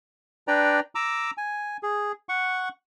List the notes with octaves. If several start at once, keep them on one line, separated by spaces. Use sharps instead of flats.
D4 B4 D5 G5 A#5
A#5 D6 E6
G#5
G#4
F#5 C#6